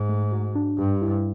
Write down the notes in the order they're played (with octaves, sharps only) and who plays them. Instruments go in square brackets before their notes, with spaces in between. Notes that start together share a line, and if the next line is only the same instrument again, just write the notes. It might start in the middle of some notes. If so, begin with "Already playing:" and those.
Already playing: [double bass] G#2
[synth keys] A3
F#4
D4
[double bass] G2 [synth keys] G4
[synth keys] E4